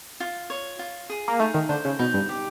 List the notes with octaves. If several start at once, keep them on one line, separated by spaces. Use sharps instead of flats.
F4
C#5
F4
G#4
A#3
A3 D#4
D#3
D3 C5
C#3
B2 D#4
G2
G4